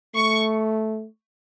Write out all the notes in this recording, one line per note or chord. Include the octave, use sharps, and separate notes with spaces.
A3 C#6